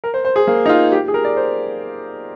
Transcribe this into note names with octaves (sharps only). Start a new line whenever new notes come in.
A#4
C5
C5
G#4
A#3
D#4
F4
G4
G#4
A#4
D5
C5